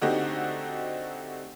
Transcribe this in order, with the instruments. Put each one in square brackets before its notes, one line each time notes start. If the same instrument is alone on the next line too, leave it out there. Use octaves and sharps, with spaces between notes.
[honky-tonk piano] D3 A3 C4 D#4 F#4 G4